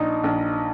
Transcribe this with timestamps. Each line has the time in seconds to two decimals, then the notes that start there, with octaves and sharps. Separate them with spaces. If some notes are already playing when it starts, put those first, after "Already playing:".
Already playing: A#1 D#4
0.24 A#1